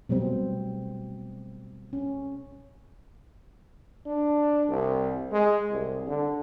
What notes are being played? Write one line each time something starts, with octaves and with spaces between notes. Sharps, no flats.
B2 F#3 G3 A3 C4
C#4
D4
C2
G#3
C2
D3